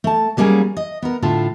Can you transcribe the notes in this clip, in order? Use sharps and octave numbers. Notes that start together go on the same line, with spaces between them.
A3 A5
F#3 G3 A#3 C#4 G#4
D#5
B3 A#4
A2 D3 F4 A4